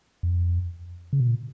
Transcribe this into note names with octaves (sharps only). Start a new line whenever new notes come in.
F2
C#3
B2
A#2